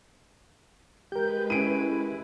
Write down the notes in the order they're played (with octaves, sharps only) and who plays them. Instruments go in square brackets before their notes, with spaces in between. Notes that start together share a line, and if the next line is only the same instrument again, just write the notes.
[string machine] G#3 B4 [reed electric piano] G4 A#4 [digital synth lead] G6
[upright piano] C#4 D7 D#7 [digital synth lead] E4